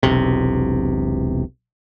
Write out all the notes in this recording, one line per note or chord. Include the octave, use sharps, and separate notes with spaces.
E1 B1 C3